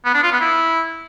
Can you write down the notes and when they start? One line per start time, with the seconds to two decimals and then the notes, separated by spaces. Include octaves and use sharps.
0.05 B3
0.14 D4
0.23 F4
0.31 B3
0.40 E4